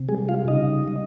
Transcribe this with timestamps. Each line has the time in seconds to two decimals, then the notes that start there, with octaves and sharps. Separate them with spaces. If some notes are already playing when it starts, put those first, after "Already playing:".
Already playing: C3
0.09 G3 G#3 G#4
0.29 F4 F5
0.48 C#3 D#4 D#5
0.88 G3